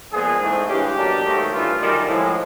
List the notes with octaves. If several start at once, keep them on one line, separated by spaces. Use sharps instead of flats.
A#2 F3 G#3 B3 G#4
G#2 E3 A3 C4
G2 E3 G#3 C#4 G4
B2 F#3 A#3 D4
G#2 D#3 F#3 A3
G2 E3 A3 F4
F#2 D#3 G3
A2 F3 G#3